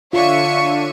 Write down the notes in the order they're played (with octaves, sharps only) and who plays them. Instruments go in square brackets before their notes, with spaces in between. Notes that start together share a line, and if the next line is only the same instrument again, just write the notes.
[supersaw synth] D3 D4 D#7 [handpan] F4 [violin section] C#5 E5 C#6 [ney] F5